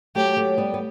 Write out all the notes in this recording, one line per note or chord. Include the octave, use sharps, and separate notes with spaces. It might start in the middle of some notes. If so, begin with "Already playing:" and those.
F#3 A3 G4
F#3 A3
G3 B3
B3